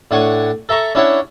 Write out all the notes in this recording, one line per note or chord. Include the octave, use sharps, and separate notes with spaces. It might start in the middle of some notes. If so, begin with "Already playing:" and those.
A2 D4 F#5 G#5 C#6
A4 E5 A#5 C#6
C#4 D4 E4 C#5 F#5